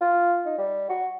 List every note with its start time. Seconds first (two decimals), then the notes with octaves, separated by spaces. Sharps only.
0.01 F4
0.46 D#4
0.58 G3
0.90 F#4